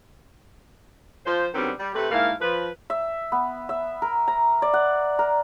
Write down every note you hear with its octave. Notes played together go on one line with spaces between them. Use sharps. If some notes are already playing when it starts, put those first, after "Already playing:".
F3 C5
D3 D#3 F#3 G3 B3 C4
G3
C3 A3 B4
G#2 A3 A#3 E4 F5
F3 B4
E5
B3
E5
A#4
A#5
D5
F#5
A#4